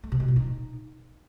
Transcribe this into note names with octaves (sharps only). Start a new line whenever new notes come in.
A3
C3
B2
A#2
D#4